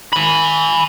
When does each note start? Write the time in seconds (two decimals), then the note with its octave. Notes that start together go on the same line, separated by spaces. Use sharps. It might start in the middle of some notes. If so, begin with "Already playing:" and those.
0.13 G#5 B5